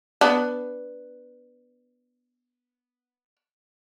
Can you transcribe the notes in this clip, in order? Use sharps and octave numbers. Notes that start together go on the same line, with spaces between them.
B3 D4